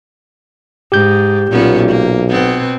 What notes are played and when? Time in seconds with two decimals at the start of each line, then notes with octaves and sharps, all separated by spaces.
0.92 G#2 G4 G6
1.52 B1 A#2 B3 C#4
1.88 A#3
2.30 B2 B3 C4